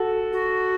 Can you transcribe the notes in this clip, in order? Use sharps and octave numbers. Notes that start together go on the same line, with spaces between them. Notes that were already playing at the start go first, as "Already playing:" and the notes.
Already playing: F#4 A4
F#4